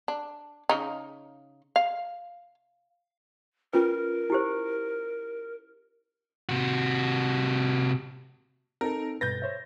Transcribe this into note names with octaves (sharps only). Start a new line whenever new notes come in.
D4
C#3 D#4
F5
C#4 F4 A#4 B4
E4 G4 C5
C3 F#4
C4 D#4 A4 A#4
G2 B2 B4 G6 A6 A#6
C5 C#5 E5